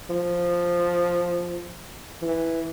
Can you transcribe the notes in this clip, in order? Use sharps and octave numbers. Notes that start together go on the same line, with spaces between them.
F3
E3